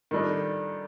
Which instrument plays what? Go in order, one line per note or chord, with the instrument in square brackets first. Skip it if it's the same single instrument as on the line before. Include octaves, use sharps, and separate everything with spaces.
[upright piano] D#3 G3 D4 A4 D#5